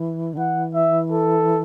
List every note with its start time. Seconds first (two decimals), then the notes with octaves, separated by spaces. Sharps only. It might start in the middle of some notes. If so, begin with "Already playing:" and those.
Already playing: E3
0.33 D3
0.37 E3 F#5
0.75 E5
1.11 A4